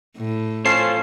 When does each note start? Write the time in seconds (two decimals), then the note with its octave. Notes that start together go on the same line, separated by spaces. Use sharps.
0.17 A2
0.65 C#4 F4 A4 C5 C7